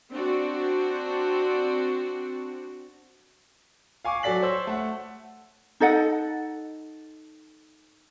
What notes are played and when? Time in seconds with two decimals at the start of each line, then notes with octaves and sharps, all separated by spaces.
0.12 C4 D4 F#4
4.05 F5 G#5 C#6 D6
4.23 F#3 F#4 A4 D5 B6 F#7
4.42 C5 C#5 E6
4.67 A3 F#5
5.80 D#4 A4 D#5 F#5